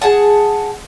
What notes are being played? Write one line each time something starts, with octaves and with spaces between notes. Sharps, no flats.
G#4 F#5 A5